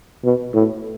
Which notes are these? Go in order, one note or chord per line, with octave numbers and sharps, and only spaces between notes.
B2
A2